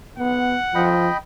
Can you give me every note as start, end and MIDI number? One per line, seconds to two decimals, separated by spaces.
0.18 0.57 59
0.18 0.86 78
0.75 1.09 53
0.75 1.17 75
0.75 1.17 79
0.75 1.17 83